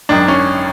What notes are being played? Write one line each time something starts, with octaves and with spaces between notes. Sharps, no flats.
G#1 F#2 D#3 D4
C#4